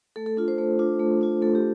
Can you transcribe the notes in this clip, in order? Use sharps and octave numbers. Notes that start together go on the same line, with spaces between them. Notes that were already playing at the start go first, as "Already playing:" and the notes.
A3 A4
A4
D4 F4 A4
C5
A3 C5
D4 F4
A3
D4 F4
A3 A4
G4